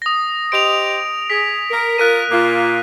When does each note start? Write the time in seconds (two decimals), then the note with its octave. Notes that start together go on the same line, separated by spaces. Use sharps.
0.02 D#6 A#6
0.52 G4 C5 D#5 D7 F7
1.30 G#4 B6
1.71 A#4
1.98 F4 A#4 F#6 B6 D#7
2.30 A#2 A#3 F4